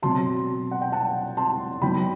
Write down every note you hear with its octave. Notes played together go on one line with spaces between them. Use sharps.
B2 F#3 C4 A5 C6
F#5
G5
F#5 A5
A5 C6
F#2 F#3 B3 D#4 G5 B5